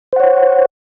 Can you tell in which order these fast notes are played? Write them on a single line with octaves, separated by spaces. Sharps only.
C5 F#5 C#5